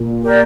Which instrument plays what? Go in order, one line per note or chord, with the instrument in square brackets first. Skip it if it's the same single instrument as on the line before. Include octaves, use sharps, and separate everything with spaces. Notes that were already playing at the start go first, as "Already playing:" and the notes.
Already playing: [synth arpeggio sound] A#2
[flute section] G4 A#4 D5